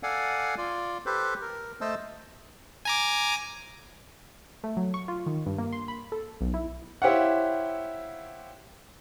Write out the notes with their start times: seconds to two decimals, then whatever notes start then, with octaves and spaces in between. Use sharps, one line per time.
0.03 A4 D5 F5 F#5 G#5
0.58 F4 D5
1.06 G4 A4 B4 C5
1.42 A#4
1.81 A3 C5 D#5 A5 E6
2.85 G#5 A#5 D6
4.64 A3
4.77 F#3
4.94 C#6
5.08 F4
5.26 D#3
5.46 G2
5.58 A#3
5.73 C6
5.88 B5
6.12 A4
6.41 B1
6.54 E4
7.02 E4 G4 C5 C#5 F5 F#5